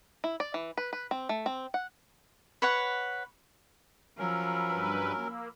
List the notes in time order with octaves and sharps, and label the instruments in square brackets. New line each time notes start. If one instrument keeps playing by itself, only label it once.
[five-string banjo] E4
D5
E3
B4
B4
C4
A3
C4
F#5
[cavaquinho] B4 C#5 F#5
[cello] F3 [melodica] F#3 C#4 A#4 [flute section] B5 E6
[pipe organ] G2 B4
A#3